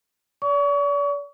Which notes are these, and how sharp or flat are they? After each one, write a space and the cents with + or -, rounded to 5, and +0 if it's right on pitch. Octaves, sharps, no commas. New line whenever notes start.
D5 -40 C#6 +35